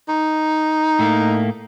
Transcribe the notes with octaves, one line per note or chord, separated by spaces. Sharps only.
D#4
A2 A3 A#3